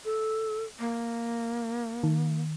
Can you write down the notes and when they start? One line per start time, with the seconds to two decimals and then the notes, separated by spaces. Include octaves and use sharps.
0.05 A4
0.79 A#3
2.03 D#3